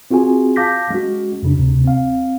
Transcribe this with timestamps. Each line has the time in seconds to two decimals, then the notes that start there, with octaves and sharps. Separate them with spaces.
0.11 C4 F4 F#4 G#4 G#5
0.56 F5 A5 D6 G6 A#6 B6
0.90 G#3 C#4 F#4
1.42 F2 C#3 D4
1.58 D2 C3
1.84 C4 F5